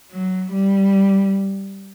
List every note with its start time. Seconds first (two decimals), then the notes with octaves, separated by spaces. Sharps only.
0.12 F#3
0.53 G3